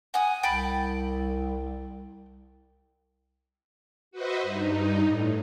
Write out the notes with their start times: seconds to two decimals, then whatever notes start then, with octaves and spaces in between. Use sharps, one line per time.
0.14 F#5 G#5 D#6
0.43 C2 G5 A5 B5
4.11 F#4 B4 C5 D#5 E5
4.43 G2 D#4
5.05 A2